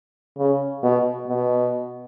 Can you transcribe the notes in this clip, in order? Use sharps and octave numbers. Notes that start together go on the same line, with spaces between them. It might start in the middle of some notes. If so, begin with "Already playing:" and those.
C#3
B2
B2